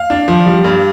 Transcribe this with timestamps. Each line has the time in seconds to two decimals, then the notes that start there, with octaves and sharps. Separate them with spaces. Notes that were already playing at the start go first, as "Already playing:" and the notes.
Already playing: F5
0.10 D4
0.28 F3
0.46 G3
0.64 G2